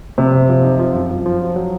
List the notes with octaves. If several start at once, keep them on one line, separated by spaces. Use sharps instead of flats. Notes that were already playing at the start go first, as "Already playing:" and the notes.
C3 F3
F#2
F3
D#4
F3
F#2
F3
F3
F#3
F#3